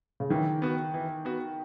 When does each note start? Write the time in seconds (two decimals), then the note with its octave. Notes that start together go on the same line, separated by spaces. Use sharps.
0.20 C#3
0.30 D#3 E3
0.62 B3 F#4
0.94 E3
1.25 B3 F#4